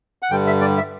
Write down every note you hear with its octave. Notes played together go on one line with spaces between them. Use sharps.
F#5
G2 D3 G3 G5
E5
D5
E5